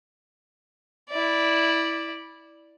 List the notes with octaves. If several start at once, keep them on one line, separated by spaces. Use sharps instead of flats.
E4 D5